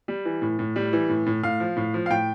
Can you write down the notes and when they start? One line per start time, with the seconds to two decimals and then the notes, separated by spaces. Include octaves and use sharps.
0.08 G3
0.25 E3
0.42 A2
0.59 A2
0.76 G3
0.93 E3
1.09 A2
1.26 A2
1.43 A2 F5
1.60 F3
1.76 A2
1.94 F3
2.06 F5
2.10 A2 G5